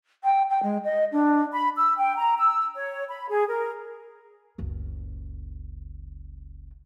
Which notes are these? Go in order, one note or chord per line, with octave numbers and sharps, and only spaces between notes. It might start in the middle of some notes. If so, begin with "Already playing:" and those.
G5
G5
G#3
D#5
D4
B5
E6
G5
A#5
E6
C#5
B5
G#4
A#4
F#1 C#2